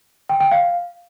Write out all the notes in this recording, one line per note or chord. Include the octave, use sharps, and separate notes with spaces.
G5
G5
F5